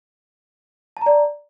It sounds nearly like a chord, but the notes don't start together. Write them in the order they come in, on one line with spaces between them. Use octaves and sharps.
A5 A#5 D5